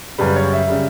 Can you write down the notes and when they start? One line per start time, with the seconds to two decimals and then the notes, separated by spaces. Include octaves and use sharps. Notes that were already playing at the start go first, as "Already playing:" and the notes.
0.18 F#2 C#3 G3 B4
0.36 C#5
0.53 E5
0.70 C#3 G3